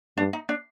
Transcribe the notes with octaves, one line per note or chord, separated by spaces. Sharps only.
G2 D4
D#4
D4